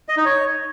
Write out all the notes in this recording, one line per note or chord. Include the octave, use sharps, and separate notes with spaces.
D#5
D#4
C#5